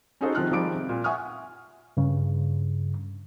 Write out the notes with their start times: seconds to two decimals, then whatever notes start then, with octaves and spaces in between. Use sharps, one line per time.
0.21 C#4 D#4 F#4 G#4 A4 C5
0.35 C3 D#3 F3 F4 F6 F#6
0.51 D#3 F3 G3 G#4 D6 D7
0.74 C3
0.89 A#2
1.04 E5 F#5 G#5 C#6 D#6 F6
1.97 G2 C#3